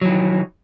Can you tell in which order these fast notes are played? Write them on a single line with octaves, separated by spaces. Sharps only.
F#3 E3 D#3